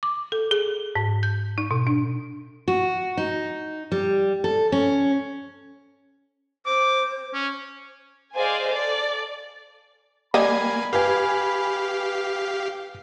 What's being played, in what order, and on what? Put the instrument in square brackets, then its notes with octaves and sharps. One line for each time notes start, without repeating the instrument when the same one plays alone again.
[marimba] D6
A4
G#4
G#2
G6
D#4
B2
D4
[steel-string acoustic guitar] F#4
D#4
G3
A4
C#4
[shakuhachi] C5 [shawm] D6
[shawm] C#4
[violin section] G#4 C5 D5 D#5 F5 G#5
A4 D5
[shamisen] G3 D#5 [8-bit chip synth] A#3 G#5 [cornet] B5
[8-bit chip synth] G4 F5 [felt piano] B4 G#5